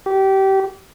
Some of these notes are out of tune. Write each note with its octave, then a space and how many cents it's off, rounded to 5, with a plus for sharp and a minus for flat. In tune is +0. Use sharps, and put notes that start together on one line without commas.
G4 -25